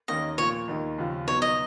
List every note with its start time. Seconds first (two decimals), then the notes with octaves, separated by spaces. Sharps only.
0.08 D#2 D#3 A#3 C#4 D#5
0.38 A#2 F3 A#3 C#5
0.68 D#2 D#3 A#3 D#4
0.98 D#2 C#3 F3
1.27 B2 F#3 B3 D#4 C#5
1.42 D#5